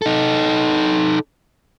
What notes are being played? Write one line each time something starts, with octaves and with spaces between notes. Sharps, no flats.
D#4 A4